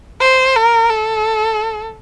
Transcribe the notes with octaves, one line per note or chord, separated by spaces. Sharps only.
C5
A#4
A4